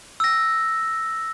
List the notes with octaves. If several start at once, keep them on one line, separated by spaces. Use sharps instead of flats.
E6 A#6